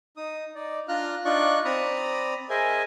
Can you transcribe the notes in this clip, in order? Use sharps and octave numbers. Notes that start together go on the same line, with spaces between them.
D#4 D#6
D#4 D5
D4 F4 F5 A#5 F6 F#6
D4 D#4 F4 D5 C#6 F#6
C4 D5 A#5 B5 D#6
G#4 A#4 C5 D#5 E5 G#5